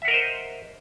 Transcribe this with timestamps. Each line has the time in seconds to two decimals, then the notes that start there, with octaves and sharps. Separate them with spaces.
0.02 E5
0.05 F#5
0.08 A#4
0.11 D#5
0.14 C5